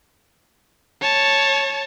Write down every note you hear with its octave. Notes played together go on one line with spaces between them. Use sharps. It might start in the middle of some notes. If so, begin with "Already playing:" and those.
C#5 A5